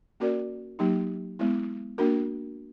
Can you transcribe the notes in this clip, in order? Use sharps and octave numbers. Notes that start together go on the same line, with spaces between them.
A#3 C#4 F#4 A#4 D5
F#3 A#3 D#4 G4
G#3 B3 E4
A#3 D4 F#4 A#4